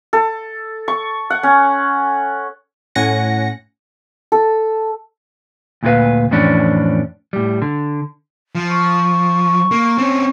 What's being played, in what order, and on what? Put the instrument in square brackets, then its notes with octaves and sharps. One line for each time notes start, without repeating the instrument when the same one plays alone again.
[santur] A4
C#6
F#5
C#4
[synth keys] A2 C#4 F#5 G#5 A#6 C#7
[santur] A4
[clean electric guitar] D2 A#2 E4 F4 B4 F5
F2 A2 E3 C#4 D4
A2 G3
D3
[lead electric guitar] F3
[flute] C#6
[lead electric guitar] A#3
C4 C#4